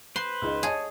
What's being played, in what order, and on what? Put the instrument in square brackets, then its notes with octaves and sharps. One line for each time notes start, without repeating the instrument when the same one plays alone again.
[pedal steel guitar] B4 C5 [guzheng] C6
[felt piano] C#2 D#4
[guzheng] G#4 [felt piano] C#5 D#5 A5